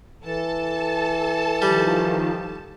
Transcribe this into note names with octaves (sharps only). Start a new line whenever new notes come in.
E3 A4 A5
D#3 F3 G3